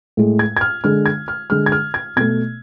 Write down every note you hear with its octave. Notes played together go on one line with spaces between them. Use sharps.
A2 G#3
G#6
G#6
F6
D3 G#3 F6
G#6
F6
D3 G#3 F6
G#6
F6
G#6
B2 A3 G#6